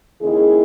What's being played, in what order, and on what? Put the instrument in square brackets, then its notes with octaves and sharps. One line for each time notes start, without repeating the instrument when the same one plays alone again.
[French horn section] D#2 C#3 G#3 E4 G#4